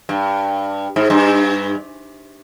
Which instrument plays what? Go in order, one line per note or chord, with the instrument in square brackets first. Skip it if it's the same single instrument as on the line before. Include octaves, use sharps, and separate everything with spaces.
[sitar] G2
G#2
G2